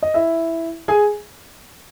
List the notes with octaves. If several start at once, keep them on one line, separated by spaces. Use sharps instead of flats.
D#5
E4 E5
G#4 G#5